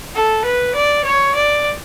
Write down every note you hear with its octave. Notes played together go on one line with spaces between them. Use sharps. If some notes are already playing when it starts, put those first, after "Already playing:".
A4
B4
D5
C#5
D5